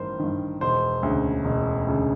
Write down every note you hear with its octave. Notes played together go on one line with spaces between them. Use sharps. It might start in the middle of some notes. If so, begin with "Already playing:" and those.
Already playing: A1 G2 D#3 A#4 C5
G2 D#3
E1 C5
D2 C#3
E1
D2 C#3